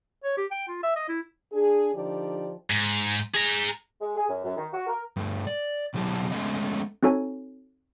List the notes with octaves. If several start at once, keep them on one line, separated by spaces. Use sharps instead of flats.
C#5
G4
G5
F4
E5
D#5
E4
D4 G#4
D3 F3 D#4 G4 D5
G#2
G#4 A#5
G#3
G#4
F#2
F#2
D#3
F#4
A#4
G2 A3
D5
B2 F#3 G3 E4 A5
G#3 A3 B3 C#4 D#5
C4 D#4 F#4 A4 C#5 G#5